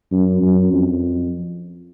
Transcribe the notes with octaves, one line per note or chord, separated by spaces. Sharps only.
F#2
F#2
F2